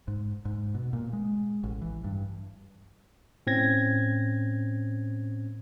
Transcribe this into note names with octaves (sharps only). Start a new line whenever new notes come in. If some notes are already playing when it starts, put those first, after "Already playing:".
G#2
G#2
B2
A#2
G#3
A1
E3
G2
A2 C4 C#4 G#6 A#6